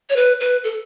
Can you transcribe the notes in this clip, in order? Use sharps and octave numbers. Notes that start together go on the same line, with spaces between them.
C#5
B4
B4
A4